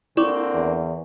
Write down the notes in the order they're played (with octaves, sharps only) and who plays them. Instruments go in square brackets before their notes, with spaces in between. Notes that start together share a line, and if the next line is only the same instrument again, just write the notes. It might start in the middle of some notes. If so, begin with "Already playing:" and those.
[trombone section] D3 A#3 C4 [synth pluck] E4 [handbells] D5 C#6 D6
[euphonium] E2